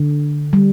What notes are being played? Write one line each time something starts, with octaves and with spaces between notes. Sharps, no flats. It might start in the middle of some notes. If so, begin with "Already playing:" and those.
Already playing: D3
G3